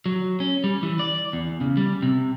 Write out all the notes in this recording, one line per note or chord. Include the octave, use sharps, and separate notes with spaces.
F#3
C#4
G3
E3
D5
E2
C#3
G3
C3